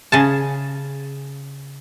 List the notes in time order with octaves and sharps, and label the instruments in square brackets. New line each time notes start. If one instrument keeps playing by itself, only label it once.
[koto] C#3 G#4 A5